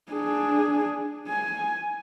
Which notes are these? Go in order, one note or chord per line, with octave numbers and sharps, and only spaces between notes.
D4 G#4
G#5